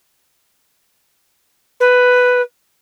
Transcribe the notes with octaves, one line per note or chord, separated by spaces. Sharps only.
B4